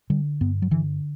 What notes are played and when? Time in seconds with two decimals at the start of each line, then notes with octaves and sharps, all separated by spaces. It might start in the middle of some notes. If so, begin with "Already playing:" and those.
0.10 D3 G3
0.41 G2 B3
0.62 F#3
0.71 D3 E3